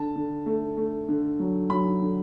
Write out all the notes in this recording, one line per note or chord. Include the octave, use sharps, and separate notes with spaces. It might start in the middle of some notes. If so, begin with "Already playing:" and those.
Already playing: D3 A5
D3
A3
A3
D3
F#3
F#3 B5
D3